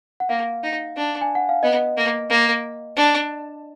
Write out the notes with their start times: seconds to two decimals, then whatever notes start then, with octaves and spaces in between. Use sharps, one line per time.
0.20 F#5
0.29 A#3 F5
0.63 D#4
0.96 D4
1.21 G#5
1.35 F#5
1.49 F5
1.63 B3 D#5
1.97 A#3
2.30 A#3
2.96 D4